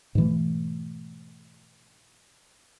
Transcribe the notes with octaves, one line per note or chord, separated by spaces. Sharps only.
G#2 B2 E3 A3